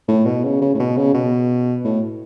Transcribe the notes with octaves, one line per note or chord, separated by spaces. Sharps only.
A2
B2
C#3
C#3
A2
B2
C#3
B2
A2